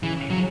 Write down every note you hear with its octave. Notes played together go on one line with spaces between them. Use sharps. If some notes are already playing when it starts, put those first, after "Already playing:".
C#3 E3
F#3